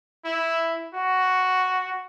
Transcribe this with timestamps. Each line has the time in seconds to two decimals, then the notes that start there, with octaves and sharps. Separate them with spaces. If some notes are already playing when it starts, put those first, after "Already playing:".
0.25 E4
0.94 F#4